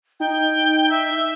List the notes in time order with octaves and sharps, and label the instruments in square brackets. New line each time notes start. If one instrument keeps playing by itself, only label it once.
[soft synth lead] D#4 [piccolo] G5
[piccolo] E5